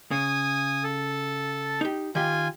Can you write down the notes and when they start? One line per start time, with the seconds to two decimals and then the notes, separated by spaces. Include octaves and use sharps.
0.11 C#3 G#5 D#6
0.83 A4 A5
1.81 D#4 G4
2.15 D#3 F4 G4 G5 G#5